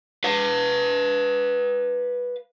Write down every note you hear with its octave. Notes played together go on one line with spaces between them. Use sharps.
B4 F5